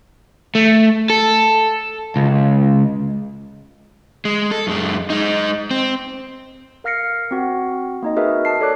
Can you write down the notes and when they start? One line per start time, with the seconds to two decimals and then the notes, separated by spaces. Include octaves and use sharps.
0.55 A3
1.10 A4
2.16 C#2
4.25 G#3
4.51 A4
4.67 F#2 G#3
5.10 G#3 D#4
5.71 C4
6.84 A#4 F5 F6 A#6 C7 C#7
7.31 C4 F#4 F#5
8.02 A#3 D#4 D#5
8.16 F#4 G#4 A#4 B4 D#5 E5
8.45 A5 C7
8.61 A4 C#5 D5 D6 F#6